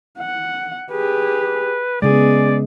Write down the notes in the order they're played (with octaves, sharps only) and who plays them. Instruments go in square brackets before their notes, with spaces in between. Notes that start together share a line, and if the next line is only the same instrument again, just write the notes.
[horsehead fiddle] F#5
[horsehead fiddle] G4 G#4 [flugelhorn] B4
[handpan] C#3 G#3 [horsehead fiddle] B3 G#4 [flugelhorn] D5